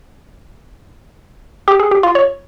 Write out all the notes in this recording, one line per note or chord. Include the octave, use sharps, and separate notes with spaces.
G4
G#4
G4
F4
C#5